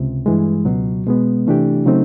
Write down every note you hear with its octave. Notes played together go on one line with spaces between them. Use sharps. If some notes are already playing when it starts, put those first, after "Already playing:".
Already playing: C#2 C3
G2 E3 G#3
C#2 B2 F#3
B2 G#3 B3
C3 E3 A3 D4 G4
C#3 F#3 A3 C4 D#4